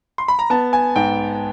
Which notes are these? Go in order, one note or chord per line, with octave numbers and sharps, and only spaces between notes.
C6
B5
A#5
B3 A5
G#5
G#2 G5